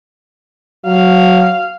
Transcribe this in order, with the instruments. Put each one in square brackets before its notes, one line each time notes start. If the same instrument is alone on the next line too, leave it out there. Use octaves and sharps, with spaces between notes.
[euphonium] F#3 [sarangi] F5